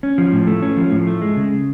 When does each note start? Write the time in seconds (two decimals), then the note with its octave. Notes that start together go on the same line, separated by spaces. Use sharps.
0.03 C#4
0.18 F3
0.32 A2
0.47 A3
0.62 C#4
0.77 F3
0.92 A2
1.07 A3
1.22 G#3
1.36 C#3